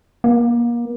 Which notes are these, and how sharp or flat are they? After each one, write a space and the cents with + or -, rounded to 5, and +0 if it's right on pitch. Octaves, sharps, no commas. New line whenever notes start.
A#3 +30